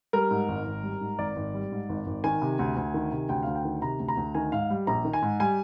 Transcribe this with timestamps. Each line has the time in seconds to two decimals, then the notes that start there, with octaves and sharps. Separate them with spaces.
0.13 G3 A#4
0.31 G#2
0.48 G#1
0.66 G#1
0.83 G3
1.01 G#2
1.18 G#1 D5
1.36 G#1
1.54 G3
1.72 G#2
1.89 G#1
2.06 G#1
2.24 D#3 G#5
2.41 C3
2.59 D2
2.77 D2
2.94 D#3
3.12 C3
3.29 D2 G5
3.43 D2 F5
3.55 G5
3.65 D#3
3.82 C3 A#5
4.00 D2
4.08 A#5
4.17 D2
4.35 D#3 G#5
4.52 G#2 F5
4.70 G3
4.87 A#1 A#5
5.05 D#3
5.13 G#5
5.22 G#2
5.40 G3 G#5